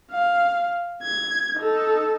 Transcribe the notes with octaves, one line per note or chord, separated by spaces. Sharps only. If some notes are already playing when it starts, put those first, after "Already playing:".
F5
G#6
D#4 A4